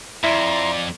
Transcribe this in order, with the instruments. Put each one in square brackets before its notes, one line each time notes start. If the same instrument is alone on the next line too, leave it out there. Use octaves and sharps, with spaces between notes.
[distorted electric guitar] F2 [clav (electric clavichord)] E4 [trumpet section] D5 [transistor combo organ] A#5 C6